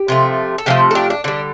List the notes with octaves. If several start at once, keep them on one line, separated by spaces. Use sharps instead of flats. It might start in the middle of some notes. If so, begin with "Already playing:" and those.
Already playing: G4
C3 F3 A3
A4
C3 F3 A3 G4 C5
A4
D4 G4
D4
D3 G3 D4